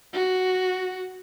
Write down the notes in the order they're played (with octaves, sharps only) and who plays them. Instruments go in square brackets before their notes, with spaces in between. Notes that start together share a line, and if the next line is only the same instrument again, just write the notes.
[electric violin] F#4